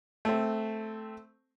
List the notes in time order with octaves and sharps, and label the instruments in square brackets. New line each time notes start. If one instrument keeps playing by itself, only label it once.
[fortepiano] A3 C4